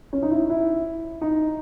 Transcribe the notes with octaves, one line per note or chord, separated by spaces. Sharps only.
C#4
D#4
E4
E4
D#4